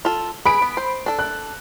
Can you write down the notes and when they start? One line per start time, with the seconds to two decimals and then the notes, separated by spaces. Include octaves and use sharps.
0.05 F4 A4
0.46 G#4 B4 B5 D7
0.62 B3
0.77 C5
1.06 D4 A4
1.19 F#6